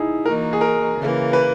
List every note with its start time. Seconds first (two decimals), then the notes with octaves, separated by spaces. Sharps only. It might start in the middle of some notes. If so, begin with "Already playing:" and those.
Already playing: D#4 E4 G#4
0.25 E3 A#3 D#4 F#4 A#4
0.53 G#4
0.61 A#4
0.97 C#3 E3 A#3
1.33 B4